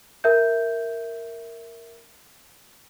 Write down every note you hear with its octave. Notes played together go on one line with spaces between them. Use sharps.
A#4 E5 G6